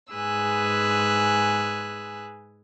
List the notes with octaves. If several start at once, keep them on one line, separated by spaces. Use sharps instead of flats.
G#2 G#4 B4 G#5 E6 F#6